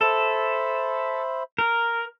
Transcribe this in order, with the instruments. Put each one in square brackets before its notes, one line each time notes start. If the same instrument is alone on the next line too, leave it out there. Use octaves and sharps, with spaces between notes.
[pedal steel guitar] A4 [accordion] C5 E5 B5
[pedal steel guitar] A#4